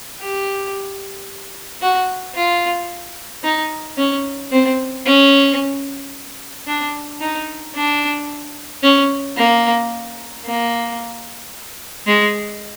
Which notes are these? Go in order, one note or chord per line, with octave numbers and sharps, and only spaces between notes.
G4
F#4
F4
D#4
C#4
C4
C#4
D4
D#4
D4
C#4
A#3
A#3
G#3